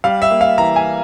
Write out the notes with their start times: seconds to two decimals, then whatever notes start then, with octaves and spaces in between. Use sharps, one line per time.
0.04 G3 F5
0.22 E5
0.31 A#3
0.41 F5
0.58 E3 A#5
0.76 G#5